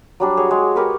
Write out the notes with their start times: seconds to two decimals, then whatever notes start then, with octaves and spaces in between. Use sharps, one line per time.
0.20 F#3 G3 D4
0.37 F#4 G#4 C#5
0.51 G#3
0.75 G4 A#4 B4 C#5